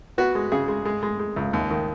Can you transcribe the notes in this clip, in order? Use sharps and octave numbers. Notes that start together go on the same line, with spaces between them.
B3 F#4
G#3
C#3 G#4
G#3
G#3
G#3
G#3
C#2
D#2
D#3